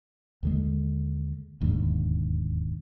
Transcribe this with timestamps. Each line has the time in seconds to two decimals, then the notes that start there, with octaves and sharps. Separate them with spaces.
0.43 D#2 D3 G#3
1.61 E1 D#2 G#2 D3